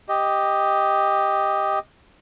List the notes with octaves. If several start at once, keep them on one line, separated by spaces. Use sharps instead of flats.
G4 D#5